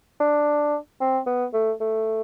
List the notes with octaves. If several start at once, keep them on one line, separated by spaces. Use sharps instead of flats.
D4
C4
B3
A3
A3